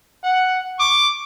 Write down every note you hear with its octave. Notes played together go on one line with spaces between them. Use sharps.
F#5
C#6 D6